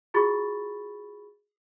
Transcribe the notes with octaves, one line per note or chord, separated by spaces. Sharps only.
F4 F#4 G#4 B5 C#6 A6